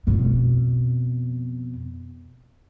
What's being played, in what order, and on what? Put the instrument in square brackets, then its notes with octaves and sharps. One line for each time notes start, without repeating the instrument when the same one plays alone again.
[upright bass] F2 B2